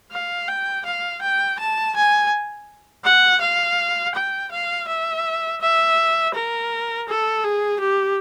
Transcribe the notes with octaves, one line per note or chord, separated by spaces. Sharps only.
F5
G5
F5
G5
A5
G#5
F#5
F5
G5
F5
E5
E5
A#4
A4
G#4
G4